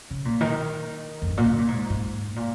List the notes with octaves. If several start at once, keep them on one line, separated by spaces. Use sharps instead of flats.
C#3
A#2
D#3
F2
G#2
A#2
C#3
A#2
G#2
G#2
A#2